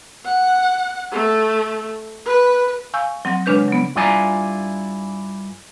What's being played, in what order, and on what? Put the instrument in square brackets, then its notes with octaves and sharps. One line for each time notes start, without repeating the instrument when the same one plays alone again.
[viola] F#5
A3
B4
[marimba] F5 G#5 C#6 E6 G6
F#3 C4 F#5 A#6
C#3 G#3 D4 B4 G6
F#3 B3
[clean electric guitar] G2 E4 F4 D5 G#5 A#5